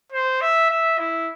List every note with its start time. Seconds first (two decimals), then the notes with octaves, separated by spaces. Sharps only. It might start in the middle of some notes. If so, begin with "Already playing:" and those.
0.12 C5
0.41 E5
0.70 E5
0.99 E4